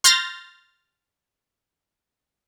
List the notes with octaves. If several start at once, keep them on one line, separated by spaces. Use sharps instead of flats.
C6 F6 G6 A6 A#6